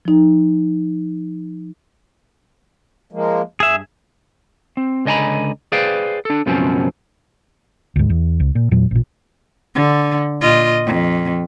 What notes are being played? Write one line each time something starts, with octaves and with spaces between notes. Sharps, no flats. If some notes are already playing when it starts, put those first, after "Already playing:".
F3 D#4
F3 G#3 A#3
G2 G#4 E5
C4
C#2 D3 D#5 G#5 A#5 B5
G#4 B4 C5 D5 F5 G5
D4 A4
C#2 F#2 B2 F3 C4 C#4
D2 G#2
E2
C#2
A#2
E2 A#2 F#3
A1 A#2
D3
A#2 F4 D#5
F2